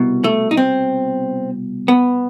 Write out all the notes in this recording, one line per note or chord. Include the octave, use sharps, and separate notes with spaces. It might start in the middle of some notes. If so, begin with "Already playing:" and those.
Already playing: C2 B2
A3
D#4
C4
B3